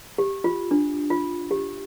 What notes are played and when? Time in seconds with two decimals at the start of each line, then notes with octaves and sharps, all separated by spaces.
0.18 G4
0.44 F4
0.71 D4
1.10 F4
1.51 G4